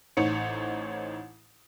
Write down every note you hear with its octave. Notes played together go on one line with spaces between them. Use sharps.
A1 D#4 C5 C#5 C#7